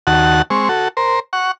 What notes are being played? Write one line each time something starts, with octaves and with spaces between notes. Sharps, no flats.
D#2 F#4 F#5 A5
G#3 C4 C#6
F#4 A4
A#4 C5
F#5 C#6